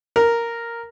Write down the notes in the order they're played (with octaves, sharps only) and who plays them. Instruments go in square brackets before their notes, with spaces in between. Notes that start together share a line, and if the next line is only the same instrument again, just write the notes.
[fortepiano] A#4